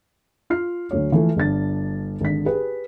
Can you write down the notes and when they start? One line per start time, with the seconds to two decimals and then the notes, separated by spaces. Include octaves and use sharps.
0.50 F4 F6 C7
0.91 D2 F#3 C#5
1.12 E3 F3 A3
1.37 G1 D4 A6
2.21 G#1 D3 B6
2.45 G4 G#4 B4